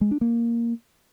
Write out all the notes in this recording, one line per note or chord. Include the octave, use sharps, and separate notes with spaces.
G#3
D4
A#3